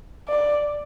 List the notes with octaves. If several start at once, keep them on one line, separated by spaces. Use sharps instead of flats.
D5